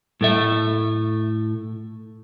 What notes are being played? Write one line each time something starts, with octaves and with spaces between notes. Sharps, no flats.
A2 A3 E5